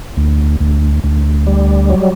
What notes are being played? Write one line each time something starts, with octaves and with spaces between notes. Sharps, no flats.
D2
D2
D2
G3
F#3